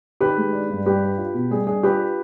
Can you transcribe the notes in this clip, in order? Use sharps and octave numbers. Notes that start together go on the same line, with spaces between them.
D#3 G4 B4
G#3
D4
G2
G3 G4 B4
D4
F4
B2
G3 G#4
D4 G#4
F4 G4 B4